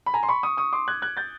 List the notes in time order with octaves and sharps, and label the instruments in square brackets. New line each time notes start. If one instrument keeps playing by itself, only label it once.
[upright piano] B5
G#5 A#5
C6
B5 C#6
C#6 D#6
C#6 D#6
C6 D6
F#6 G#6
F#6 G#6
G6 A6